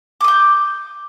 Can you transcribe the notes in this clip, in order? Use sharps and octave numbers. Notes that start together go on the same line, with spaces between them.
D6 D#6 G6